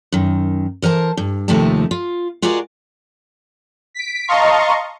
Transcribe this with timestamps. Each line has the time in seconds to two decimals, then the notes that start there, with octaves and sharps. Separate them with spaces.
0.12 F#2 D#3
0.82 E3 A#4 C5 A5
1.17 G2
1.48 D#2 C3 F3 A3 D#4 A5
1.91 F4
2.42 F4 F#4 G#4 A#4 D5 D#5
3.94 B6 D7
4.28 D#5 F5 A5 A#5 C6 C#6